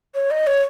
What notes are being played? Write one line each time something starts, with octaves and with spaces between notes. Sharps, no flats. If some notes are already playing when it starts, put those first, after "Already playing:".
C#5
D#5
C#5